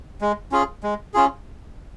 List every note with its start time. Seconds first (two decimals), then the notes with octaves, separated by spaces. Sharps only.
0.21 G#3
0.52 C#4 F4 G#4
0.83 G#3
1.14 C#4 F4 G#4